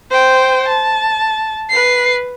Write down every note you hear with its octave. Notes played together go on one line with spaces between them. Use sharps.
C5 G5
A5
B4 C7